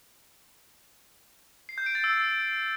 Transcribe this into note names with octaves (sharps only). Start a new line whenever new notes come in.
C7
G6
D7
A6
E6